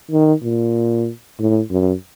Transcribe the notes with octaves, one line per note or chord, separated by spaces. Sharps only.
D#3
A#2
A2
F#2